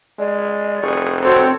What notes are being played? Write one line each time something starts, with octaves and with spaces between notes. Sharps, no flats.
G#3 D5
F1 G#4 C#6
C4 F#4 A4 C#5